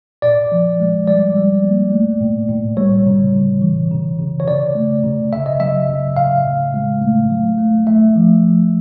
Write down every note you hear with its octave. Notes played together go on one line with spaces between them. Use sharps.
A#2 D5
F3
G#3
G3 D5
G3
A#3
A3
A2
A2
G3 C#5
C#3
C#3
E3
C#3
C#3
C#5
C#3 D5
A3
C#3
C#3 E5
D#5
F#3 E5
C#3
A2 F5
A2
G#3
A3
F#3
A3
A3 E5
F3
A3